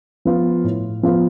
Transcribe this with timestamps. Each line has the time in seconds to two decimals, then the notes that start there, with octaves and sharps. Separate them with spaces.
0.25 F3 B3 F4 B4
0.64 A2
1.03 F3 B3 F4 B4